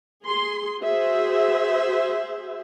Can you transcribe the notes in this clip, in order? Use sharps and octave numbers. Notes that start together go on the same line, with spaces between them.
G#4 C6
F#4 G#4 C5 E5